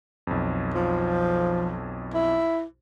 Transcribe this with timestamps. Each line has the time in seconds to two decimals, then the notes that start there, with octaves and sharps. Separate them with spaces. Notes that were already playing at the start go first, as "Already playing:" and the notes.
0.27 B1 F2
0.74 F3
2.14 E4